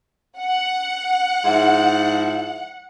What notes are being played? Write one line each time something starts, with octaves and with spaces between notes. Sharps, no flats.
F#5
G#2 F3 E4